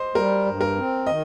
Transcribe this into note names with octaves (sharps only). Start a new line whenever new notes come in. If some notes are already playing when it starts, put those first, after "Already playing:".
Already playing: C5 D#5
G3 A#4
G2
A#4
C4
D#3 D#5